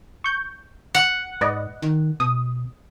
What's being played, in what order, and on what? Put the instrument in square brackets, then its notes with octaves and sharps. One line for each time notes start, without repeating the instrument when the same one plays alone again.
[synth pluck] C#6 G6
[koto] F#5
[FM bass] G#2 [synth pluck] B4 D5 D#5
[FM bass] D#3
[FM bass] B2 [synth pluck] D#6